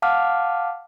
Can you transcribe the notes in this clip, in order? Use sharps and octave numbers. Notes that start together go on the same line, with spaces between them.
F5 F#5 A5 D6 F6